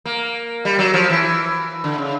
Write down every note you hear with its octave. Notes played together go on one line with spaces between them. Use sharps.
A#3
G3
F#3
F3
E3
D3
C#3